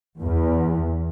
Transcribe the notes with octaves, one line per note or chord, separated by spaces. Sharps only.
E2